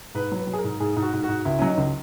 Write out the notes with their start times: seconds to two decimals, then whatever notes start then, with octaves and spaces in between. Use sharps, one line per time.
0.15 G#2 B4
0.32 F#3
0.37 B4
0.47 F#3
0.53 G#4
0.58 A#4
0.64 G#2
0.80 G#2 G#4
0.97 G#2
1.02 F#4
1.13 G#2
1.24 G#2 F#4
1.45 C#2 E4
1.59 F#3 C#4
1.67 D#4
1.78 C#2